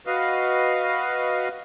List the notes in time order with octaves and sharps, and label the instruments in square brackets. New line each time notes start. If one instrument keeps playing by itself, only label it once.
[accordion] F#4 B4 D#5 F5